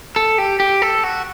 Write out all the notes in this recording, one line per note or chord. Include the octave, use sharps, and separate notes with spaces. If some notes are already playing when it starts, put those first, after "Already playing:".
A4
G4
G4
A4
F#4